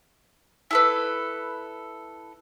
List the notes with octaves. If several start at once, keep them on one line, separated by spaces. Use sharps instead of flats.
E4 A4 B4